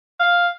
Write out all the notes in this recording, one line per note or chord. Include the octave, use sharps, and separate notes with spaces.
F5